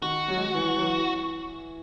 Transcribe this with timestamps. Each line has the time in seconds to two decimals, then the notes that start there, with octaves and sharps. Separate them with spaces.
0.02 D#3 F#4
0.28 F#3
0.37 G#3
0.46 F#3
0.54 E3
0.76 F#3
0.81 E3